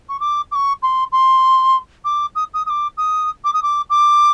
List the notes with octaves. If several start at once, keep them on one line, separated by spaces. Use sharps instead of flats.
C#6
D6
D6
C#6
C6
C6
D6
D#6
D#6
D#6
D6
D#6
D6
D#6
D6
D6